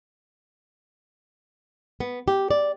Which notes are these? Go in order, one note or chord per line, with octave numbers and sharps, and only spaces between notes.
B3
G4
D5